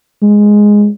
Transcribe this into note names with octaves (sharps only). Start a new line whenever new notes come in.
G#3